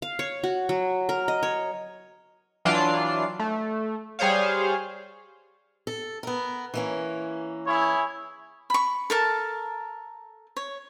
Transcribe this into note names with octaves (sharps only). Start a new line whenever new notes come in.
F5
C#5
F#4
F#3
A#4
D#5
C#5
E3 F#3 D4 F4 D5 C7
A3
G3 G#4 C5 C#5 F5
A4
B3 A#4
E3 A#3 C#4
E4 G#4 C#5
B5 C#6
A4 A#4 A5
C#5